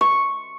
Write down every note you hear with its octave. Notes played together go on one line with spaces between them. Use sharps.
C#6